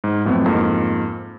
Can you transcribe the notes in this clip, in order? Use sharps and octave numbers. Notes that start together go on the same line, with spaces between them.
G#2
F2 A2 F#3 B3 C4
F2 G#2 A#3